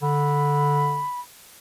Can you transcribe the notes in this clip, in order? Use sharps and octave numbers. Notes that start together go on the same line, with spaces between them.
D3 B5